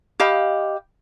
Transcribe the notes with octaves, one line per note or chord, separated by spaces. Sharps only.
G4 D#5 F5 B5